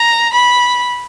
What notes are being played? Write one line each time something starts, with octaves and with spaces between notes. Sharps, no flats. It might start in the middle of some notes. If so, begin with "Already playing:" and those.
Already playing: A#5
B5